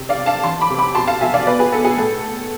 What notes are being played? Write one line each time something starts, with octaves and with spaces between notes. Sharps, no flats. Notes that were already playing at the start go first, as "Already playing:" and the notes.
Already playing: C3
D5 F5
C3
F5 A5
E3 A5 C6
B5 D6
C3
B5 D6
B2 A5 C6
F5 A5
B2 E5 G#5
D5 F5
B3 B4 D5
G#4 B4
B3 A4
G#4
A2 A4